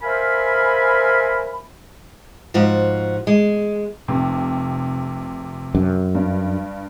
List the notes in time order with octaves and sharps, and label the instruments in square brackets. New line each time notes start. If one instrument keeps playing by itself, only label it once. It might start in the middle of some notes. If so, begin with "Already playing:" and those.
[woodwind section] A#4 C5 E5 F5 G#5 B5
[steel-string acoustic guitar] G#2 F3 F4 F#4
G#3
[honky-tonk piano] F1 C3
[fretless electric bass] F#2
[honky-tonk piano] G2